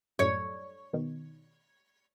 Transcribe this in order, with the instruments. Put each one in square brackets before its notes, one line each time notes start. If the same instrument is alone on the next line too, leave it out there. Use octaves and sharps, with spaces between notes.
[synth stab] F#2 A2 [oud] C#5
[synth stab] B2 D#3